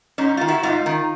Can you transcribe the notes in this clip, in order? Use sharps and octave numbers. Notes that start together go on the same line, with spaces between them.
G#2 C#4 D#4
D#3 F4
E4 F#4
G#2 D#4 F4
D#3